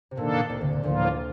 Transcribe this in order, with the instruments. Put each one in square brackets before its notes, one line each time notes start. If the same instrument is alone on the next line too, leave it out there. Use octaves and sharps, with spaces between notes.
[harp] C3
[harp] A#2 [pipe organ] D#3 A#3 D4 A4
[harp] A2
C2 C3
D2 D3
A#2
[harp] D2 D3 [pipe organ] A2 F3 A#3 F4